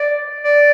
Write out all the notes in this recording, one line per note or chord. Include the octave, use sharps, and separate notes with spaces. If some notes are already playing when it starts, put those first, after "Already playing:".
Already playing: D5
D5